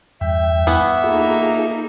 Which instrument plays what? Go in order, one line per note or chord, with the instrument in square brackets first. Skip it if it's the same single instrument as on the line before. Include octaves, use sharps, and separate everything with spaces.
[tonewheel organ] E2 G2 G5 [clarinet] E5
[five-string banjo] E3 B3
[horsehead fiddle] A#3 D#4 [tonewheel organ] F4 G#4 A4